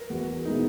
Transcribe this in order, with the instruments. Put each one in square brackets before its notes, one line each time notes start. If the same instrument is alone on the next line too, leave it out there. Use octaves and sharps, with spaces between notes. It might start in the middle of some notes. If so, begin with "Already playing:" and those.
Already playing: [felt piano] A#4 B4
[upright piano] E2 [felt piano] F#4
[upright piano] B2 G#3 B3 E4 [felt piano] D#4